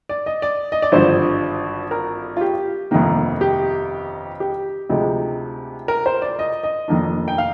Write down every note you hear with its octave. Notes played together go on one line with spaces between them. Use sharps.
D5
D#5
D5
D#5
D5
G#1 G2 D3 F3 C5
A#4
F4
G4
G1 F2 C3 D#3 A#3
G4
G4
D2 C3 F3 G#3 D#4
A#4
C5
D5
D#5
D#5
F1 F2 D#3 A#3 D4
G5
F5